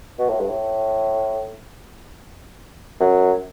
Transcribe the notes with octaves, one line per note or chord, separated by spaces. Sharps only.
B2
A2
G2
A2
F#2